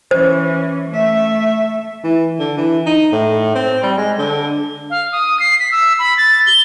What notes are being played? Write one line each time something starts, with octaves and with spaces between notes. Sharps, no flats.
E3 C#4 C5
A3 E5
E3
D3
E3
D#4
A2
C4
G3
G#3
D3
F5
D#6
C7
B6
E6
B5
A6
G7